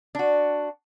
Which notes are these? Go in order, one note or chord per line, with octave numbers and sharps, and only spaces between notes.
D4 F#4